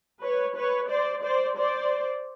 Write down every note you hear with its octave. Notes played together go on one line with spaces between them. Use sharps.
B4 C#5
B4 C#5
C5 D5
C5 D5
C5 D5